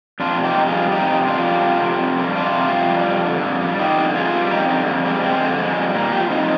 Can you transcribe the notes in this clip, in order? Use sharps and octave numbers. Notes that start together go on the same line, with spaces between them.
F2 D4 F4
C3
D#4 G4
F2
F4 G#4
G3
F2 D#4 G4
C3
F2 D4 F4
G3
F2
C3
F2
G3
F2 D4 F4
C3
F2
G3
F2
D3
F2
G3
F2 D#4 G4
D3
F2 F4 G#4
G3
F2 D#4 G4
D3 C4 D#4
F2
G3 G#3 C4
F2 G#3 C4
D3
F2 G#3
G3
A#2 A#3
F3 G4
F4
F3 C4 D#4